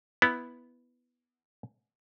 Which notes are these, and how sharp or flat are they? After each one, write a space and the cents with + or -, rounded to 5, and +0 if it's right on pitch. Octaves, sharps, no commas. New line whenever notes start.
B3 +0 E4 +0